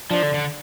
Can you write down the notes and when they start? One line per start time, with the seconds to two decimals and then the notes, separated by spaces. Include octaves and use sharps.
0.11 F3 D4
0.23 D3
0.34 D3